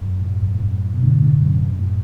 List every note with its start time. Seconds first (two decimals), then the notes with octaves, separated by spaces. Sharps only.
0.01 F#2
0.22 A2
0.42 F#2
0.55 A2
0.62 F#2
0.94 B2
1.02 A2 D3
1.22 A2 D3
1.42 F#2
1.63 F#2
1.79 A2